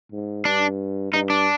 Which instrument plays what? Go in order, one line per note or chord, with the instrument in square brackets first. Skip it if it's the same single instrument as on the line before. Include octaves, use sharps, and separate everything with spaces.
[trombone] G#2
[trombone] G2 [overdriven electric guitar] D4
[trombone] G2 [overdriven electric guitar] D#4
[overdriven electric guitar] D4